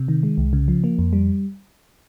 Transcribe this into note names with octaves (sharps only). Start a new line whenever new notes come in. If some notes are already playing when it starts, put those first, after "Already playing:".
Already playing: C3
D#3
G#3
C2
C#3
F3
A#3
F2
G3